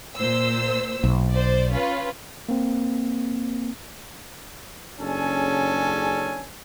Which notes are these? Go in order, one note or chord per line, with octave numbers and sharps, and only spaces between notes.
A#2 C5 E6
B1
C5 D5
C#4 F4 B4
A#3 C4
F#1 C#3 C#4 D4 A4 G#5